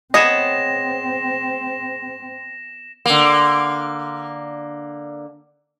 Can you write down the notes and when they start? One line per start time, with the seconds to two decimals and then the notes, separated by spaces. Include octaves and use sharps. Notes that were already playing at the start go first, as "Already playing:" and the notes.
0.14 B3 C4 G#4 C#5 D#5 A#6 E7
3.06 D3 A#3